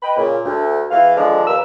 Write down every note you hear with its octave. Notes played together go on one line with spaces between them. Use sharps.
B4 D#5 G5 B5
A#2 C#3
D2
E2 E3 F5
D3 D#3 F3 G#3 D4
D#2 A#4 B4 F5 E6